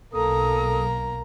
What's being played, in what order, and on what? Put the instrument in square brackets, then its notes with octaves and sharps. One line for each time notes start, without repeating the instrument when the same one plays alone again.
[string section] B1 [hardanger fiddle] A#3 A#5 [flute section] A4 D#6